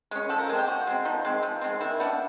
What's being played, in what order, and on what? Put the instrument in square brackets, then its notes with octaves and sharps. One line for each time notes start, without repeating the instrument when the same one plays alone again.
[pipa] G#3 C#4
F3 A4
A#4
G#3 G#4
C4
G4
F3 F#4
G#3 C4
F3 D#4
G#3 C4
F3
G#3 C4
D#3 E4
G3 B3 D4